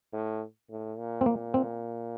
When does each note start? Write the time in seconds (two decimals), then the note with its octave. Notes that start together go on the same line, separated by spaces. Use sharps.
0.13 A2
0.70 A2
0.98 A#2
1.21 C4
1.26 A#2 A#3
1.54 C4